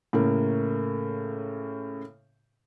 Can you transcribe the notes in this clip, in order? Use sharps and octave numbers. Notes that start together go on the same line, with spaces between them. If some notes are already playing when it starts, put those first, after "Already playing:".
A2 C#3 A#3